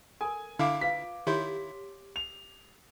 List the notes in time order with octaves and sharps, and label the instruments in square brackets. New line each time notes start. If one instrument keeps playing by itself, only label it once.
[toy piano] A4 A#4 [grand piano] G#5
[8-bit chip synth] D3 E4 [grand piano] F5 D6
[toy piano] F4 B4 F5 [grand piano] B6
[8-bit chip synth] D#3 E4 [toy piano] G4 C#5 C6
[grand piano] F7